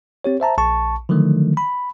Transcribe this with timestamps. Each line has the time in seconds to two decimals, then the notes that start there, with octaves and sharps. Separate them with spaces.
0.24 C4 G4 C#5
0.40 C5 E5 A5 A#5
0.58 A#1 A5 C#6
1.09 D3 D#3 F3 F#3 A3
1.57 B5